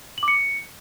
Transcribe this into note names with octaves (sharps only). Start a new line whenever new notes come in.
F#7
D6
C#7